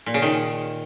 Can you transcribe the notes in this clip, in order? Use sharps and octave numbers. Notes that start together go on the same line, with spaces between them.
A#2
C#3
D#3